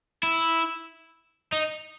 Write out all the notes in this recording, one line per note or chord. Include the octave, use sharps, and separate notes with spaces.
E4
D#4